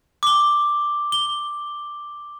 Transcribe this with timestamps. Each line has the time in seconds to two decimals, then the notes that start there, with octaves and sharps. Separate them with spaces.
0.23 D6 G7
1.12 G7